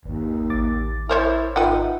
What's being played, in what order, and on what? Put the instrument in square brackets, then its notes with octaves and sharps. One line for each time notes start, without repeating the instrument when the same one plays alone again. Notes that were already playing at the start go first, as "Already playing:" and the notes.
[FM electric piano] G1 [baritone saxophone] D#2
[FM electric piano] A1 D6 A6
[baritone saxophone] E4 [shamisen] A#4 C5 C#5
[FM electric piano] G#1 F4 E5 [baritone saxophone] D#4 [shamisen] B4 F#5 G5